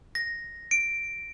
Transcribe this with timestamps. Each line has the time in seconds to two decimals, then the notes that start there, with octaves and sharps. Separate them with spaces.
0.15 A#6
0.71 D7